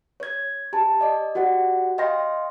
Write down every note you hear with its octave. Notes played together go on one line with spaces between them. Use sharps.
C#5 G#6
G4 G#5 A5
D5 D#5
F#4 G4 D5 F#5
D#5 F5 G5 C6 A#6